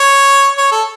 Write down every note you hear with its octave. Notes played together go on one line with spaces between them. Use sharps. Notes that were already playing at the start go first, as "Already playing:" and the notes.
Already playing: C#5
C#5
A4